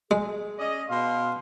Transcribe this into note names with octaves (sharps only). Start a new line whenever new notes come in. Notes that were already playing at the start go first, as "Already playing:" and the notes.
G#3 G#4
C#4 D5 D#5
B2 F5 C6